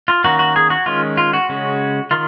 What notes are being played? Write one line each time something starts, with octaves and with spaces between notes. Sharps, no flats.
F4
D#3 A#3 C#4 F#4
F#4
G#4
F#4
D#3 G#3 C#4 F4
F4
F#4
C#3 G#3 C#4
D#3 F4